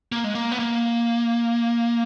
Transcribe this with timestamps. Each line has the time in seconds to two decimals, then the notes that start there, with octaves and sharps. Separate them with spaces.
0.12 A#3
0.24 G#3
0.35 A#3
0.52 B3
0.59 A#3